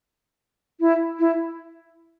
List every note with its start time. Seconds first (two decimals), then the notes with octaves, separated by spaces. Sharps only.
0.80 E4
1.19 E4